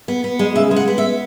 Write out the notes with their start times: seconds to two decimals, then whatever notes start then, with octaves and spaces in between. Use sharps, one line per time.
0.08 B3
0.24 B3
0.39 G#3
0.56 C#3 E5
0.71 G#3
0.76 F#5
0.88 B3
0.98 E5
1.02 B3